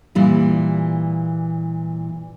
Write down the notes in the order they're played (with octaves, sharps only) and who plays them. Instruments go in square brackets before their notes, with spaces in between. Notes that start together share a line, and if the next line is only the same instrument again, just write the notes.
[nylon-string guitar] A#2 E3 G3